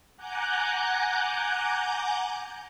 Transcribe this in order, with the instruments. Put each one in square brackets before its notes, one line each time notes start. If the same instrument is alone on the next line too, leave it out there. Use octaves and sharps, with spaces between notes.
[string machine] F#5 G#5 A#5 D6 F#6 G6